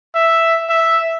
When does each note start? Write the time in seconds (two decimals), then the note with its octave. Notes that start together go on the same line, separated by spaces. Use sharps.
0.15 E5
0.69 E5